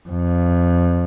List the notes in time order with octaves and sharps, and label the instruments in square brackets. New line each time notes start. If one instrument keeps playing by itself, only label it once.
[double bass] F2